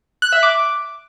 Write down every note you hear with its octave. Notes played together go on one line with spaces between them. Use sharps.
F#6
E5
D6